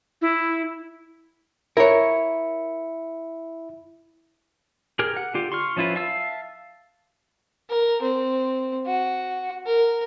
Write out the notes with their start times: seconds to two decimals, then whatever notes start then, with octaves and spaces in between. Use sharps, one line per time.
0.22 E4
1.77 E4 A#4 C#5 C#7
4.99 G4 G#4 A#4 F6
5.17 F#5
5.34 D3 F4 G4
5.52 C6 C#6 F6
5.76 F3 C#4 E4 F4 B4
5.95 E5 F5 A5 E6
7.69 A#4
8.01 C4
8.86 F#4
9.66 A#4